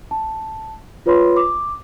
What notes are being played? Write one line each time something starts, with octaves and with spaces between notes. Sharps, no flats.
A5
F4 B4 C#5 B5 C6
D6